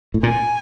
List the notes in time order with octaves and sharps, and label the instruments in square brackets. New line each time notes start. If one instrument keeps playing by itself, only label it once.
[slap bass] A2
[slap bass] A#2 [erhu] G#5